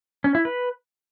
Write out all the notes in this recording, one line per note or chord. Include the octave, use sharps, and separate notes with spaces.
C#4
E4
B4